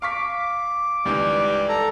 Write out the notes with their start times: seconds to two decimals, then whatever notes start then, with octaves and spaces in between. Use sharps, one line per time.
0.02 F5 C#6 D6 B6
1.05 C#2 D#3 E3 G3
1.69 A4 A#5